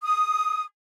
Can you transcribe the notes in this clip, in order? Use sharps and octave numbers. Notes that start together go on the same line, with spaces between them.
D#6